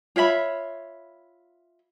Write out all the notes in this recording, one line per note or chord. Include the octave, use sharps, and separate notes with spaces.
F4 C#5 E5 B5